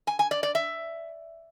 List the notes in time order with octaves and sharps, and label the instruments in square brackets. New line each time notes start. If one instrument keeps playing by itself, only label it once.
[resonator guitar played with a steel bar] G#5
G#5
D5
D5
E5